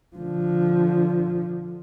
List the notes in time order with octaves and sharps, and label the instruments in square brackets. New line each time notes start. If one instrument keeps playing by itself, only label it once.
[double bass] D3 F3